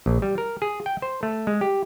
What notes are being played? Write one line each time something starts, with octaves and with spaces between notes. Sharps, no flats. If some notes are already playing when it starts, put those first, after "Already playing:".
A#1
G3
A#4
G#4
G5
C5
A3
G#3
G4